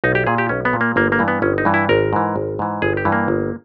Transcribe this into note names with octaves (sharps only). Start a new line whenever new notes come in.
B1 D#4
G4
A#2 G#4
G4
B1 C#4
B3
A#2
A#3
G1 A#3
A#3
G2 E3
B3
G1 C#4
D#4
G2 E3
E4
G#1 A#4
G#2 E3
G#1
G#2 E3
G1 G#4
G4
G2 E3
A#3
G1